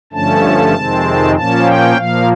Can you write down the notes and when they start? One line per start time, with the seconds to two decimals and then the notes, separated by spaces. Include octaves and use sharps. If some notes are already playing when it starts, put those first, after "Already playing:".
0.13 G2 D3 F3 A3 C#4 A5
0.74 F2 C3 D#3 G#3 C4
1.35 A#2 F3 A#3 C#4 A5
1.66 G5
1.97 A#2 F3 A#3 F5